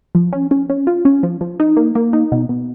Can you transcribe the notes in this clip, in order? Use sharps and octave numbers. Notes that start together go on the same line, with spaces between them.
F3
C#4
C#4
C#4
F4
C#4
F3
F3
D#4
A#3
A#3
D#4
B2
B2